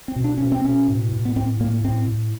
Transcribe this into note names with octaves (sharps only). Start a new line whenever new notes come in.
C4
B2
D4
B2 C#4
C4
B2 C#4
A2
A2
B3
A2 C4
A2 A#3
A2 C4
A2